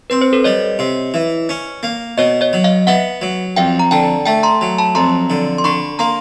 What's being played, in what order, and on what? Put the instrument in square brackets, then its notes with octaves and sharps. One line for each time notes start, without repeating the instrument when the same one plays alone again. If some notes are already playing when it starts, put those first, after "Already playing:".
[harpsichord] C4 [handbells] B4
[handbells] C5
A4 B4
[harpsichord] G3 [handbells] C#5 D#5
[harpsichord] C3
E3
C#4
A#3
[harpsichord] B2 [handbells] C#5 D#5
[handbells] C#5 D#5
[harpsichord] F#3
[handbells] D#5 F5
[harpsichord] B3 [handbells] E5 F#5
[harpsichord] F#3
[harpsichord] F2 [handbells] F5 G5
[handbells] A#5
[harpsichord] D3 [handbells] G5 A5
[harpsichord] A3 [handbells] G5 A5
[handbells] A#5 C6
[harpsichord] F#3
[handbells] A5 B5
[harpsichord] F2 [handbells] A#5 C6
[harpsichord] D3
[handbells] C6
[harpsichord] D3 [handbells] B5 C#6
[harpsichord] A#3 [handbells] A#5 C6